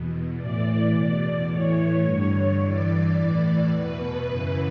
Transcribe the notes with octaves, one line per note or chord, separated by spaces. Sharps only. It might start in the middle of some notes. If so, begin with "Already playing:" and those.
Already playing: E2 B2
A2 E3 D5
E2 B2 D5
A2 E3 C#5
G2 D3
G2 E3 D5
A2 E3
E2 B2 B4
F#2 C#3 E3